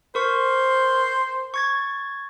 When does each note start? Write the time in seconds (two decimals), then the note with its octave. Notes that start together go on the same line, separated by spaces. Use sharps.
0.15 A#4 C5 C#6
1.54 C#6 G#6 A6